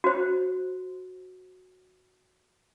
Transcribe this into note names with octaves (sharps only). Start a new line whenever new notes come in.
F#4 C5